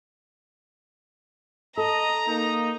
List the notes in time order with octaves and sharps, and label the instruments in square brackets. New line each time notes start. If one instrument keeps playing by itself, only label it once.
[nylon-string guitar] A4 [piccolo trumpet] D#5 [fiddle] A#5
[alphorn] A#3 [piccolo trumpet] D#4